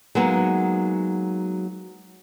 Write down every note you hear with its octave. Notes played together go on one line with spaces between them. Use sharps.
F#3 G#3 A#3 B3 D#4